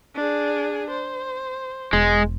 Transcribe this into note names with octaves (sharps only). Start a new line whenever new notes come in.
D4 G#4
C5
E1 G#3